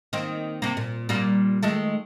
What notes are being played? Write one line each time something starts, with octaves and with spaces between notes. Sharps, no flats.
D#3 A#3 C4
C3 A#3
A#2
A#2 G3 A#3
D#3 G#3 A3